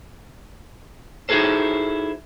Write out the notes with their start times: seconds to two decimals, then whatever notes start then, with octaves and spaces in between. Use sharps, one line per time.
1.29 D#4 E4 F#4 G#4 A4 C5